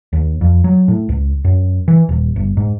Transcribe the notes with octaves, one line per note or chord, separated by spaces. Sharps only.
D#2
F2
F#3
A2
C#2
F#2
E3
D#1
G1
G#2